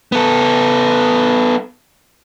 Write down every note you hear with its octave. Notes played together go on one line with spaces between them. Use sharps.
B3 A4